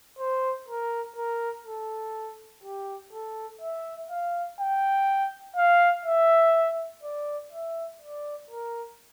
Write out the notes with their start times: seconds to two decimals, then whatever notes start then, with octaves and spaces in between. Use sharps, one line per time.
0.19 C5
0.68 A#4
1.16 A#4
1.66 A4
2.64 G4
3.13 A4
3.61 E5
4.10 F5
4.60 G5
5.56 F5
6.05 E5
7.03 D5
7.52 E5
8.01 D5
8.51 A#4